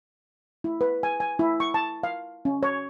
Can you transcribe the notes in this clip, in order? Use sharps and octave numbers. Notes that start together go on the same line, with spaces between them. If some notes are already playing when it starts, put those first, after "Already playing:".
E4
B4
G#5
G#5
E4
C#6
A5
F5
C#4
C#5